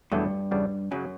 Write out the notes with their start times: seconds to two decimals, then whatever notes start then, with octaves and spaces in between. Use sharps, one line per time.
0.12 E2 G2 B2 F#3 A3 D4
0.51 E2 C#3 G3 B3 D4
0.91 F#2 C#3 F#3 C#4